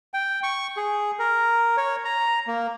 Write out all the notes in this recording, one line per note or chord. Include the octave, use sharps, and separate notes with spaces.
G5
C#6
G#4
A#4
C#5
A#5
A#3